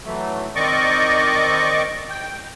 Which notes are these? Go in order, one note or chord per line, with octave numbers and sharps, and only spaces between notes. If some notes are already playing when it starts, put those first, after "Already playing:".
E3 F#3 A3
D#3 C4 D5 D#5 C#6 D6
G5